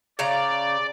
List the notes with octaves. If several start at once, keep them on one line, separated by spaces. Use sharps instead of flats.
C#3 D5 F5 A#5